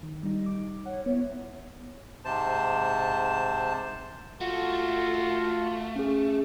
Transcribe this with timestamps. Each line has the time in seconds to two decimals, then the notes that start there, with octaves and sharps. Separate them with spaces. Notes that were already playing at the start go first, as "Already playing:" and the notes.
0.03 D#3
0.23 G3 D#4
0.46 D6
0.86 C#5 F#5
1.06 B3 E4 C#5
2.25 G#2 C3 C5 A5
4.41 A3 F4 F#4
5.96 C#4 G#4